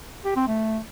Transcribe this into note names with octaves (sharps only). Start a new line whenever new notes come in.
G4
C4
A3